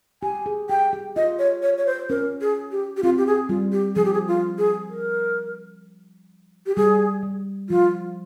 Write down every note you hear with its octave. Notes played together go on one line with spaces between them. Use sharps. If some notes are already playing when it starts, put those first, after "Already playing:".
G4 G#5
G#4
G4 G5
G4
F4 D#5
C#5
C#5
C#5
C5
C#4 A#4
G#4
G4
G4
C4 F4
G4
G#4
G3 F4
G4
F3 G#4
G4
G#4
F4
G#4
A#4
G4
G3 G#4
G3
F3 F4